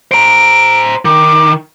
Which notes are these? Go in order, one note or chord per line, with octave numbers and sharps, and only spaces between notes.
C5 A#5 D7
D#3 D6